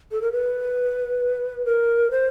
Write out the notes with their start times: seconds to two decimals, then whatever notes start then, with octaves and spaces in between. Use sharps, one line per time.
0.12 A4
0.22 A#4
0.32 B4
1.66 A#4
2.11 C5